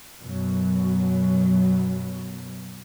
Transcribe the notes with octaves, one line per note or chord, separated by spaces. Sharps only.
F#2 B2 F#3